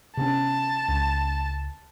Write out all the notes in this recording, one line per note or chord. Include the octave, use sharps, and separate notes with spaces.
C3 B3 C#4 A5
C#2